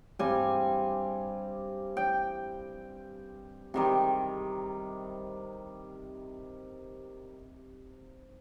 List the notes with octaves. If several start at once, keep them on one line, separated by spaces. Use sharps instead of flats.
G2 G3 C4 G#5
G5
C3 D#3 G3